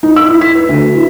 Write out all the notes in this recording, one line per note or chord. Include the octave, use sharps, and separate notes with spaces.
D#4
E6
E4
B6
B4
D2
E4